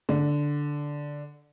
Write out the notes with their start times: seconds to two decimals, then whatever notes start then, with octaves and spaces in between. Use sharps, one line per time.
0.09 D3